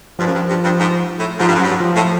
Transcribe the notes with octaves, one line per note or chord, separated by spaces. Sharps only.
G2 F3
F#2
G2
G2
G2
G#2
A2
G#2 F3
G2
F#2
G2 F#3
F3
A2